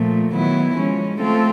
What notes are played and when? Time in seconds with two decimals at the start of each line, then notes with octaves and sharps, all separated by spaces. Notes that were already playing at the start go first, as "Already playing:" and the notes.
Already playing: A#2 F3 A3
0.33 D#3 F#3 B3 E4
0.76 F3 G#3 C#4
1.19 A3 C4 F4 A4